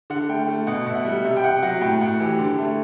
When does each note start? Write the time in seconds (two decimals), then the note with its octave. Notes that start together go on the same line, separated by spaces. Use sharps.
0.10 D3 F#5
0.29 A3 G5
0.48 A3
0.67 B2 F#5
0.86 B2 E5
0.95 F#5
1.05 G3
1.24 C3 E5
1.36 G5
1.43 C3 F#5
1.62 F#3 F#5
1.81 A2 G5
2.01 A2 F#5
2.20 E3 G4
2.39 D3
2.58 A3